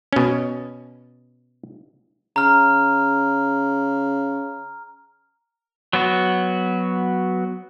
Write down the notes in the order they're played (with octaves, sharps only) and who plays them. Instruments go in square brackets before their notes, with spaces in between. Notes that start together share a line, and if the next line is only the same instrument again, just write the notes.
[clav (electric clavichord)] B2 C#4
[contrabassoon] C#3 [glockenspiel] A#5 F6
[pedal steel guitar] F#3 B3 F#4